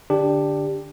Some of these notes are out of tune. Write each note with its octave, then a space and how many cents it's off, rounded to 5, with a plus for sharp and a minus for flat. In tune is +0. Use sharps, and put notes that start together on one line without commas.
D3 +0 D4 +0 G4 +10